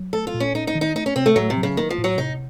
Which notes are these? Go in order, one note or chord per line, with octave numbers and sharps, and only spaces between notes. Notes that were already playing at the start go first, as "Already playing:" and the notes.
Already playing: F#3
A3 A4
F4
A#2
C#4
C#4 D#4
D#4
D#3
D#4
A3 D#4
C#4
C3 C4
A3
A2 F#3
C3
F#3
C#3
D#3 A#3
F3
A2
F#3
C3 D#4